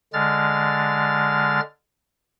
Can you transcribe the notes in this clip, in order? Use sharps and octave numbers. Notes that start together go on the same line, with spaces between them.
D3 G#3 F6 A6